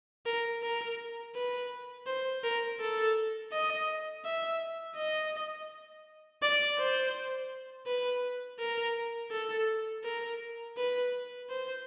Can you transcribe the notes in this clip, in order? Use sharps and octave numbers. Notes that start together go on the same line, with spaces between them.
A#4
A#4
B4
C5
A#4
A4
D#5
E5
D#5
D5
C5
B4
A#4
A4
A#4
B4
C5